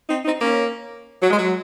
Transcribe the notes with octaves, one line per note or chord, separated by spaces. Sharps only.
C4 D#4
C4 D#4
A#3 C#4
F#3
G#3
F#3